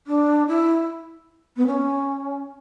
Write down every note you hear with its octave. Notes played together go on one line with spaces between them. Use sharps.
D4
E4
B3
C#4